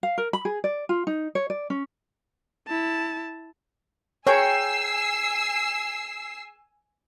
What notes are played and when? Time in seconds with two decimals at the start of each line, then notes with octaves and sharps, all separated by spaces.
0.03 F5
0.18 A#4
0.33 B5
0.45 G#4
0.64 D5
0.89 F4
1.07 D#4
1.35 C#5
1.50 D5
1.70 C#4
2.68 E4 A5
4.27 G#4 A#4 C#5 G5 G#5 E6 C7